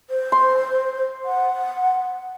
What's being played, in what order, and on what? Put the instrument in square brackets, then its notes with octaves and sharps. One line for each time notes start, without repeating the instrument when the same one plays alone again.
[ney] C5
[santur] C6
[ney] F#5